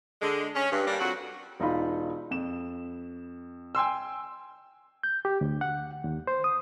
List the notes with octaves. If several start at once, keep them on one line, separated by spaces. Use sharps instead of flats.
D3 G#3
C#4
G2
G3 A#3 D4
F2 F#3 F#4
E1 D#4 F4 B5
F2 E7
G5 G#5 C6 E6
G6
G4
D2
F#5
D#2
C5
D#6